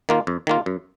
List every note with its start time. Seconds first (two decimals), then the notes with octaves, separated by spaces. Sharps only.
0.09 D#3 A#3 F4
0.27 F2
0.47 D#3 A#3 F4
0.66 F#2